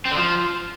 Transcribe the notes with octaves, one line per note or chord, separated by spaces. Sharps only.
C4
D3
F3